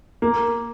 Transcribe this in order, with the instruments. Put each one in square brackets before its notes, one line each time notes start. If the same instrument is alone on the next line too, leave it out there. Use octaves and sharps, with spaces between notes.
[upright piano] A#3